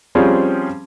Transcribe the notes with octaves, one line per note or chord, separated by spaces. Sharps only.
F3 G3 C4 C#4 G#4